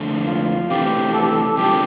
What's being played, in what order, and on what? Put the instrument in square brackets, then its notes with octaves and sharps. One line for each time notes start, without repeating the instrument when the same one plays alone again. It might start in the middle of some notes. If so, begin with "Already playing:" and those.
Already playing: [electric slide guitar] F2 D3 A3
[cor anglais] F4
[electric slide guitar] C3 E3 A3 [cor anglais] G4
[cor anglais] A4
G4
A4
[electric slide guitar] C3 G3 D4 F4 [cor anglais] G4